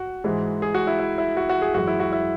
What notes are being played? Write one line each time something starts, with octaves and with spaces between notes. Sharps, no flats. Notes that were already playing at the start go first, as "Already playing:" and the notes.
Already playing: F#4
G#2 E3 G#3
G#4
F#4
E4
E4
E4
F#4
F#4
G#4
F#2 E3 G#3 F#4
E4
F#4
E4